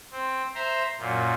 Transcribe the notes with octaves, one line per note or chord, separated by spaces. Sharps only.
C4
C5 E5 A#5 C6
F#2 A#2